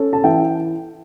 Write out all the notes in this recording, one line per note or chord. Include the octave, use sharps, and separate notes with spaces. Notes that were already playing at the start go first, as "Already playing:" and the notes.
Already playing: C#4 A4 C#5
A5
E3 E5 G5